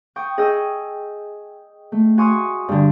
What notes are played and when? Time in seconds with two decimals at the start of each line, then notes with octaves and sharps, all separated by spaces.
0.16 G5 C#6 D#6
0.38 G#4 D#5 G5 C#6 E6 G6
1.92 A3
2.17 F#4 G#5 C6 C#6 D#6 F6
2.68 G2 D3